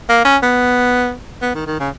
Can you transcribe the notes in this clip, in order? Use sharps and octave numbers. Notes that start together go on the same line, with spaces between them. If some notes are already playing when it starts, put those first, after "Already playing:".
A#3
C#4
B3
B3
D#3
D#3
C#3